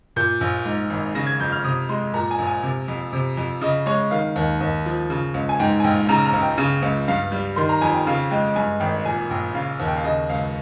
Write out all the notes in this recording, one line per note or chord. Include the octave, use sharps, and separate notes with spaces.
A#2 G6
A#1
G#2
G#1
C#3 A#6
G#6
F2 G6
F6
C3 D#6
G#3 C6
A#2 A#5
G#5
A#1
G#5
C3
F2
C3
F2
C#3 D#5
G#3 C#5
D#3 F5
D#2
D#2
F3
C#3
C#2
G#5
G#2 G5
G#5
A#1 G5
C#3 A#5
A#5
C#2
G5
C#3
C#2
G2 F5
G3
D#3 C6
A#5
F2 G#5
G5
C#3 F5
G#3 G5
G2 G#5
G#1 G5
A#2 G#5
A#1 G5
C#3 F5
D#2
G5
F5
C#3 D#5
C#2 F5